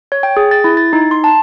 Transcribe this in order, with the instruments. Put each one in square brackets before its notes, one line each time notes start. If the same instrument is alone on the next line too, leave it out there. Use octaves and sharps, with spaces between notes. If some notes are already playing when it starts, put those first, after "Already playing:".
[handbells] C#5
G5
G#4
A6
E4
A6
D#4
C6
A5